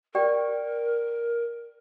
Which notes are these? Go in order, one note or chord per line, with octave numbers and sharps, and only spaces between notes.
G4 A#4 D5 G5